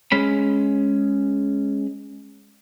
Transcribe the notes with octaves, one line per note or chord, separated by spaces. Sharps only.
G#3 C#4 B5